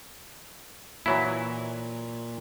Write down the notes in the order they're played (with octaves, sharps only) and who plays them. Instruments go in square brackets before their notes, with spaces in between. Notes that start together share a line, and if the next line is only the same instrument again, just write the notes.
[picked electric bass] A#2 [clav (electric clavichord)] E3 F#3 E4